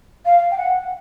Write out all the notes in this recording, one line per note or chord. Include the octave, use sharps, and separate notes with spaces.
F5
G5
F#5